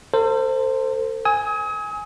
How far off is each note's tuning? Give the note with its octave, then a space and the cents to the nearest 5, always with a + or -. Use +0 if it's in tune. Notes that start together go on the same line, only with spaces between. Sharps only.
A4 +45 C5 +0
G#5 +0 D#6 +40